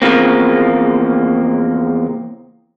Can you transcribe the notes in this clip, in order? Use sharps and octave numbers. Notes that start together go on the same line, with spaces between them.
E2 C#3 E3 F3 A#3 C4